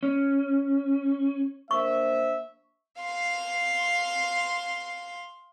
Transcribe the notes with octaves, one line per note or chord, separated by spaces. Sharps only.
C#4
A#3 D4 C5 E5 C#6
F5 C6